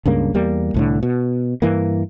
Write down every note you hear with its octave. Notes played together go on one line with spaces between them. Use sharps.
C#2 G2 C#3 A#3
E2 G3 A#3
C2 A2 D3
B2
G2 E3 A#3